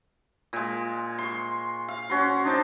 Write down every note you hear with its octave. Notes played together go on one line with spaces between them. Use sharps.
A#2 G#3
C6 C#6
F5
C#4 F#4 C6
D4 D#4 C5 A5